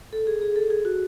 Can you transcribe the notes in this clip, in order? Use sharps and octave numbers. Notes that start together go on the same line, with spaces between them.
A4
G#4
G#4
A4
G#4
F#4